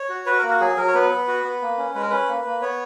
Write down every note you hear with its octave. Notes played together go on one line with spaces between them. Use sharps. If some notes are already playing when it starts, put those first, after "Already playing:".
Already playing: C#5
F#4
F#4 B4
A#3 A#4
F#4
F#3 G#4
F#3 A#4
C#5
B3 B4
B3
F#4
B3
A#3
C#4
G#3 B4
A#4
C#4 B4
A#3
A#3
B3 C#5